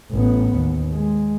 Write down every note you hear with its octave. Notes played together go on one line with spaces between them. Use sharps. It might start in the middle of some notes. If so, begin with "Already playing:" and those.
A1 B3
D#2
G#3